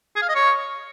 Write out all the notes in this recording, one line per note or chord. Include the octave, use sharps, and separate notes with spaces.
G#4
F5
D#5
C#5